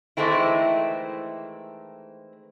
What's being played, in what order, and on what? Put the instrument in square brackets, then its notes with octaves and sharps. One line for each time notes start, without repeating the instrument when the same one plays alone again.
[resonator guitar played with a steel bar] D#3 E3 G#3 A3 C4 E4